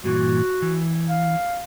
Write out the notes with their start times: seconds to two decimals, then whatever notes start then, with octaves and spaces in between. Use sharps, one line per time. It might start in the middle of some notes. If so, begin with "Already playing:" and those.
0.04 G2 A#2 E3 F#4
0.62 E3
1.09 F5